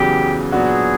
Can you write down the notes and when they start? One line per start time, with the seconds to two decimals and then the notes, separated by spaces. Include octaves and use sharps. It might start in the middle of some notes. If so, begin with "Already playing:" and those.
Already playing: E2 C#3 F#3 G4
0.52 A#2 F#3 B3 D4 F#4 G#4